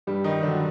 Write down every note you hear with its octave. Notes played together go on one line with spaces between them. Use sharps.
G2 G3 G4
D#3 D#4
D3 F#3 D4